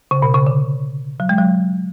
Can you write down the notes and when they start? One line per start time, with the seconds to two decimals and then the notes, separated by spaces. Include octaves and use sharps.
0.11 C#3
0.22 B2
0.34 C#3
0.47 D3
1.20 F#3
1.29 G#3
1.38 F#3